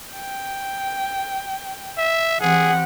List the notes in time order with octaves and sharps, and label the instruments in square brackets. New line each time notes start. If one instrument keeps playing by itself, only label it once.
[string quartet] G5
[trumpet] E5
[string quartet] E3 C4 G4 [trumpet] G#4 [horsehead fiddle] F#5